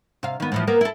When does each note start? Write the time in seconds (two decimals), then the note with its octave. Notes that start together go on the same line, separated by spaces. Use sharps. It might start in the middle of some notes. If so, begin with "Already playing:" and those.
0.23 C3 F5
0.40 D#3 B3
0.52 A2 E3 F3
0.67 A#3 B3 A#4
0.81 E4 A4